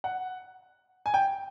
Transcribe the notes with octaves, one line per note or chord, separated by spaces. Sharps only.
F#5
G#5
G5